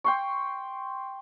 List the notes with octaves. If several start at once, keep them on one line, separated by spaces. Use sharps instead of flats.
G5 C6 C#6